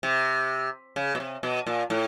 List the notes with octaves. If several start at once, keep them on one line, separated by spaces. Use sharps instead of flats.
C3
C#3
B2
C3
B2
A#2
A2